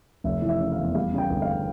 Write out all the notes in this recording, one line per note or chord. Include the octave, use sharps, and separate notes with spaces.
F1 E5
E3
E5
C#3
F5
E2
G3 F5
C#3
G5
G1
F5